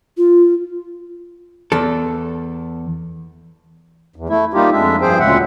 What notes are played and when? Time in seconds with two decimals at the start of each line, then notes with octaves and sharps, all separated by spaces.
0.17 F4
1.72 E2 A4
4.16 E2
4.29 A3 E4
4.54 G3 A#3 D#4 F4 G4
4.72 F2 G#3 D4 E5
5.01 G2 F3 G#4 C5 G5
5.19 D2 A#2 C#3 G#3 E5 F#5